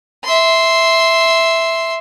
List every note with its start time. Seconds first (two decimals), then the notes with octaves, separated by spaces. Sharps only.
0.24 E5 C6